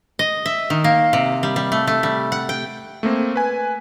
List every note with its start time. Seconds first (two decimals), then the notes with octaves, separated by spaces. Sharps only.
0.19 D#5
0.46 E5
0.70 D#3
0.84 A#3
1.13 C3
1.43 G3
1.56 G3
1.72 A3
1.87 A3
2.03 G3
2.32 F#5
2.49 G5
3.03 A3 A#3 C4
3.36 B4 G#5